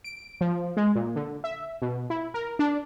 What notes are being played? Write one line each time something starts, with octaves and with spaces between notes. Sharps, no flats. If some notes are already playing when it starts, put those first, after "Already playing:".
D7
F3
G#3
A#2
D3
E5
B2
E4
A#4
D4